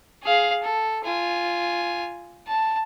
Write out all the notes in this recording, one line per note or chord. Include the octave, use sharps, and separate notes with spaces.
G#4 F5
A4
F4 G#5
A5